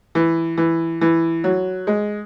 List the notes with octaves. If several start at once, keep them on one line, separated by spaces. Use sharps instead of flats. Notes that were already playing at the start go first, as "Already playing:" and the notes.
E3
E3
E3
F#3
G#3